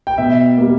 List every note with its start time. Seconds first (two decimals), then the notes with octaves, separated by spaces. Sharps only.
0.07 G5
0.18 B2 E5
0.58 G3 A#3